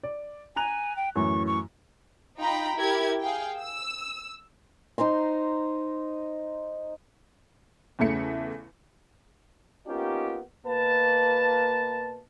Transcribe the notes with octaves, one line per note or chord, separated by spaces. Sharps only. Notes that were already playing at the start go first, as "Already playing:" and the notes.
D5
G#5 A#5 F#6 F7
G5
F#2 A2 E3 C#6
C#6
D#4 F4 G5 A#5 B5
E4 G4 A#4 G#6
G#4 F5 G5
E6
D#4 C5 A#5 C6
E2 C#3 A3 C#7
A#3 B3 C#4 D#4 F4 G4
B2 A#3 B4 A5